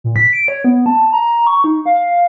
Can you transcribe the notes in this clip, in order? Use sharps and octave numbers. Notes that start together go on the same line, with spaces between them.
A#2
B6
D7
C#5
B3
A5
A#5
C#6
D#4
F5